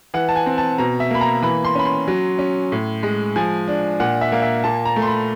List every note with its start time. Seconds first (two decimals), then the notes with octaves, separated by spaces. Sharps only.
0.14 E3 F#5
0.29 A5
0.36 G#5
0.46 C4
0.58 A5
0.78 B2 A#5
1.00 E5
1.10 A#3 B5
1.21 A#5
1.42 E3 B5
1.65 C6
1.75 C#4 B5
1.85 C6
2.08 F#3
2.39 C#4
2.72 A2
3.03 G#3
3.36 F3 G#5
3.68 D4
4.00 A#2 F#5
4.21 E5
4.32 A#3 F5
4.42 E5
4.64 A#2 A5
4.85 A#5
4.96 A3
5.02 C6
5.07 B5